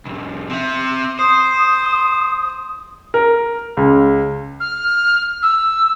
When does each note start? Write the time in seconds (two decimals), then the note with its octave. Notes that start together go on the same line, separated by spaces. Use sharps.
0.05 C2 F2
0.50 C4 E5
1.19 C5 D#6
3.14 A#4
3.77 C#2
4.60 F6
5.42 E6